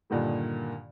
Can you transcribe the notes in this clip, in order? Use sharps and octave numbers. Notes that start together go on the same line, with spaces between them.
G2 A#2 D3 D#3 G3